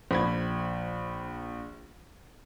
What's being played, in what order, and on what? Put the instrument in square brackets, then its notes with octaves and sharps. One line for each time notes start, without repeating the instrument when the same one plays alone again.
[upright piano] A#1 B5 G#6